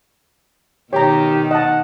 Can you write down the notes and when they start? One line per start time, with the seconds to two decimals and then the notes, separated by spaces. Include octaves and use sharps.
0.93 B2 D#3 G4 C#5 A#5
1.51 D#5 F#5 A5